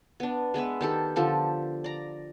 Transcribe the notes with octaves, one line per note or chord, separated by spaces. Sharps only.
B3 D4
G#3 B3 B4 E5
D#3 G4 A4
D3 F3 G4 A4
D5 A#5